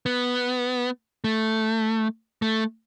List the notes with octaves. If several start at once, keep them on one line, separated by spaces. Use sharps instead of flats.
B3
A3
A3